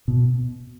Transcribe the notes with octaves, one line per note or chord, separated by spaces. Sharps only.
B2